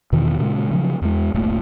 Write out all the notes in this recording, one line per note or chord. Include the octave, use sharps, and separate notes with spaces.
E2 B2 D#3 E3
A#2 C#3 G3 G#3
C#3 F3 F#3
E2 G#3
D1 G1 A#2 A3